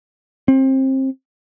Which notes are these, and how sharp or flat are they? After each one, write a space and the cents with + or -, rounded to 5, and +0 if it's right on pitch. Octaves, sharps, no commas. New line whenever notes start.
C4 +25